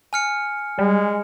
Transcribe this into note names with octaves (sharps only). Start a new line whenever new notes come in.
G#5 F6 C#7
G3 G#3